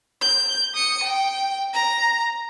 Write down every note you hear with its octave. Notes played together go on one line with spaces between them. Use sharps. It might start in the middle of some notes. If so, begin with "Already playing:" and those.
G6
D#6 C#7
G5
A#5